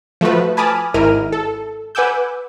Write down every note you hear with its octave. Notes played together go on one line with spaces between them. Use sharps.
F3 A3 F#4 B4
G#5 A5 B5 D6 D#6 F6
G#1 G#2 E4 A#4 F6 D#7
A4
B4 F#5 G#5 D6 E6 G6